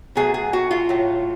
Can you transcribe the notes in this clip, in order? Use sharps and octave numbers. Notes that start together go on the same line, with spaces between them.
B2 F#3 A3 G#4
G#4
F#4
F4
A2 F#3 A3